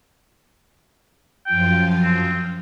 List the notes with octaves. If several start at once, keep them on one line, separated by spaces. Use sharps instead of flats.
F#2 F3 F4 G5
C4